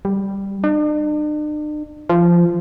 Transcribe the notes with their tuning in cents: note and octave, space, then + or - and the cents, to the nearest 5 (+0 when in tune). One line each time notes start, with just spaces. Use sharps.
G3 +5
D4 +45
F3 -15